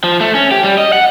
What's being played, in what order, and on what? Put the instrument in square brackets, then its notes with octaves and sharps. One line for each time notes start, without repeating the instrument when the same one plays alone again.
[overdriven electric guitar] F3
A3
C#4
G4
G3
D#5
F#5